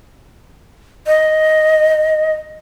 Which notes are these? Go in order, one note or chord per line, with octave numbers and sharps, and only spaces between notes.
D#5